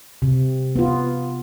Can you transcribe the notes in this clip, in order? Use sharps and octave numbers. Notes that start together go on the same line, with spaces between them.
C3
B3 F4